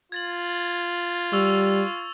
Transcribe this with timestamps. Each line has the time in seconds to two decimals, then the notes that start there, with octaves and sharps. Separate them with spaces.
0.12 F4 G#6 A6 F#7
1.32 G3 C#6 E6 F7